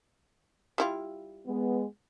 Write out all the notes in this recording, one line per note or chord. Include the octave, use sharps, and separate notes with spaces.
G3 E4 F4
G#3 B3